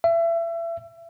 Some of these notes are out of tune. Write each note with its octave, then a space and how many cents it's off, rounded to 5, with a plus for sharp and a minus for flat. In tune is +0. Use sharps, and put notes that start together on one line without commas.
E5 +30